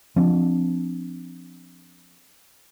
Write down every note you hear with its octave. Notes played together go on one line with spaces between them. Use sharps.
F3 C4 D4